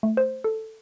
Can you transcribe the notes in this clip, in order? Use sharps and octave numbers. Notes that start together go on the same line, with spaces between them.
A3
C5
A4